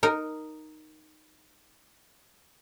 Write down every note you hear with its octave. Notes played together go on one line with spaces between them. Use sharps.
D#4 A#4